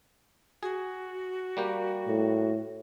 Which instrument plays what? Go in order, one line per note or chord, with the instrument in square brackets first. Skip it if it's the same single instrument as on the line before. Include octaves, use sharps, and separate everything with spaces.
[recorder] F#4 [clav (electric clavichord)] G#4
[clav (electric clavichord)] G3 A#3 G4
[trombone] A2